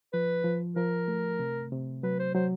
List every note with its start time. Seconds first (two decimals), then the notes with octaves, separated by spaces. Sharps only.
0.13 F3 B4
0.44 F3
0.76 F3 A#4
1.08 A3
1.39 C3
1.72 C3
2.03 F#3 B4
2.19 C5
2.34 F#3 C5